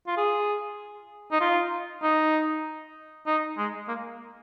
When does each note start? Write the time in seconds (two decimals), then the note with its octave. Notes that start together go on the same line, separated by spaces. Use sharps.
0.07 F4
0.17 G#4
1.32 D#4
1.41 F4
2.03 D#4
3.27 D#4
3.57 G#3
3.88 A#3